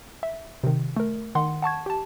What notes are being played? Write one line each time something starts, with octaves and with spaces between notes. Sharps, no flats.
E5
C3 D#3
A3 A#4
D#3 F#5 C6
F#5 A5 C#6 G#6
G4 A5